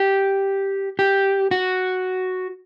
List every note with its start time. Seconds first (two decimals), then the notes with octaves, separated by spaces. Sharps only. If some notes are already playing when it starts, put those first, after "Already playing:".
Already playing: G4
0.99 G4
1.51 F#4